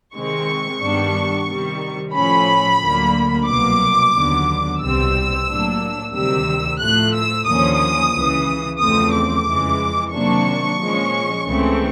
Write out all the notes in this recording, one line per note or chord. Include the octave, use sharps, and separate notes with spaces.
C3 D#3 G#3 C4 C#6
G2 D#3 G3 B3 D4
C3 D#3 G3
A2 F3 A3 C#4 B5
D2 D3 F#3 A#3
C2 B2 F#3 A#3 D6
D#2 D3 F#3 B3
C2 B2 G3 C4 E6
A2 F#3 A#3 D4
D2 C3 D#3 G3 E6
A2 F3 A3 F#6
E6
D#2 D3 F3 A#3 C#4 D#6
C#2 C#3 E3
E2 C#3 F3 A3 C4 D#6
D6
F2 C#3 E3 G#3
C3 D#3 F#3 A#3 D4 C#6
A#2 F3 G#3 C#4
C#2 C#3 E3 A3 C4